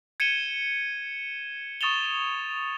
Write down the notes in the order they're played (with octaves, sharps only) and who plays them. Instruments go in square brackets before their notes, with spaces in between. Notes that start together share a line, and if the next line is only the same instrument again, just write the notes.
[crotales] G#6 C#7 D#7 E7 G7
C#6 D#6 A6 E7 F7 G7